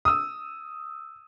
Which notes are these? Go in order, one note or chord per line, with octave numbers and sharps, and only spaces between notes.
D#6 E6